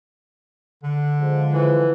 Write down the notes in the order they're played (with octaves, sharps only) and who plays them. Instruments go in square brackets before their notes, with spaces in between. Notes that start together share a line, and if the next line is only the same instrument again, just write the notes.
[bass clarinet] D3
[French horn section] F3 G#3
[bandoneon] E3